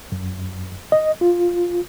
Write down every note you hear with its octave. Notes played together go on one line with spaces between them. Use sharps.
F#2
D#5
F4